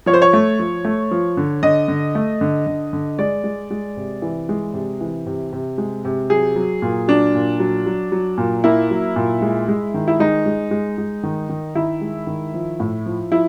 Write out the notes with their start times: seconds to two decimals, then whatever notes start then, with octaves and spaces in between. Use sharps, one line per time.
0.06 F3 C#5
0.13 C5
0.22 C#5
0.33 A3
0.59 F3
0.85 A3
1.11 F3
1.37 D3
1.63 D3 D#5
1.88 D3
2.15 A3
2.41 D3
2.67 D3
2.93 D3
3.18 G#3 D5
3.44 G#3
3.71 G#3
3.97 C3
4.22 E3
4.49 G#3
4.74 C3
5.01 E3
5.26 C3
5.52 C3
5.78 G#3
6.05 C3
6.30 F#3 G#4
6.56 F#3
6.82 A#2
7.08 F#3 D4
7.35 A#2
7.60 F#3
7.86 F#3
8.12 F#3
8.38 A#2
8.64 A#3 E4
8.90 F#3
9.16 A#2
9.42 G#3
9.68 G#3
9.94 D#3
10.08 E4
10.19 G#3 D#4
10.46 G#3
10.71 G#3
10.98 G#3
11.23 D#3
11.49 D#3
11.75 D#3 E4
12.01 G#3
12.27 D#3
12.54 F3
12.80 A2
13.06 F3
13.31 F3 E4